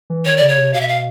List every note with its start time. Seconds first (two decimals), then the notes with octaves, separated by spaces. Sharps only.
0.10 E3
0.25 D#3 C#5
0.37 C#3 D5
0.48 C#5
0.58 C3
0.73 B2 F5
0.81 E5
0.88 F5